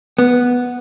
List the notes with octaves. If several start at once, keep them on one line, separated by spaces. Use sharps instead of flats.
B3